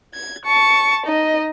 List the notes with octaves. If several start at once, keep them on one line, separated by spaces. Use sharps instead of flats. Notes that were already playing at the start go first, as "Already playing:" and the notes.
G#6
A5 C#6
D#4 D#5